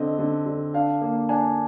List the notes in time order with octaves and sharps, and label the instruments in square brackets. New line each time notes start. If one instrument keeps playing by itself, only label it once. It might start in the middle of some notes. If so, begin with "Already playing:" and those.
Already playing: [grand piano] D3 C4 D#5
D3
D3
D4 F5
A#3
D4 G#5